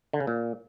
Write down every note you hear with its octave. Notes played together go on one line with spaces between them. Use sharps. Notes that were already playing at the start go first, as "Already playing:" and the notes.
D3
C#3
A#2